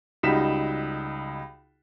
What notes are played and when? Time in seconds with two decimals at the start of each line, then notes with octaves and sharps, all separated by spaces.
0.23 C#2 G3 D#4 F#4 B6 E7